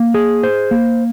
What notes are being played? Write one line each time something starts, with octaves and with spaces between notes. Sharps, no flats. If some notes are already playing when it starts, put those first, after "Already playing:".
Already playing: A#3
G#4
C5
A#3